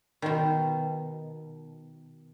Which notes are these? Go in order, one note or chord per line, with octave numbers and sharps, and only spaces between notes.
B2 D#3